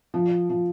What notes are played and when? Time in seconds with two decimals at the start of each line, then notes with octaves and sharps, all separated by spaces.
0.14 F3
0.49 F3